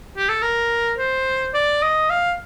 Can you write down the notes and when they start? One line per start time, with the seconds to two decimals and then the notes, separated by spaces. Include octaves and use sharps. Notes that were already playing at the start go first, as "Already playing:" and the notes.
0.17 G4
0.29 A4
0.42 A#4
0.98 C5
1.54 D5
1.83 D#5
2.10 F5